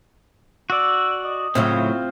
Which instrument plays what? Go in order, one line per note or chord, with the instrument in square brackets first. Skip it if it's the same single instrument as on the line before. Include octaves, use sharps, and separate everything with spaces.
[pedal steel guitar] F#4 D5 [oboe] E6
[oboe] D#5
[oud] A2 C#3 F#3 [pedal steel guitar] C4 F4